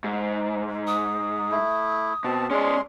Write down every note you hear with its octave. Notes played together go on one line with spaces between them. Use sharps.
G#2
D#6
A3 E4
B2 C4 A5
G#3 C#4 G#4 D5 C6